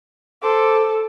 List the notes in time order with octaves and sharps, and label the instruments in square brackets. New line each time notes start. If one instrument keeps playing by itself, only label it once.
[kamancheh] A4 [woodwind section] C5 D6